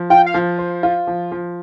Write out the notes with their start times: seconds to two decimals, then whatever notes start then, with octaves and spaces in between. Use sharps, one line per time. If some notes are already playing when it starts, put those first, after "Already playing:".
Already playing: F3
0.10 F4 G5
0.26 F5
0.34 F3
0.59 C5
0.83 F4
1.07 F3
1.32 F3